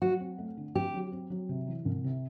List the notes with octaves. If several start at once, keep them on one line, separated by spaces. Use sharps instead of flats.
F#3 F#4
C4
A3
D3
C4 G4
F#3
C4
F#3
C3
E3
C2
C3